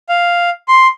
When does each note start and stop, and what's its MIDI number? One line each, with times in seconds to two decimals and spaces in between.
0.09 0.50 77
0.68 0.87 84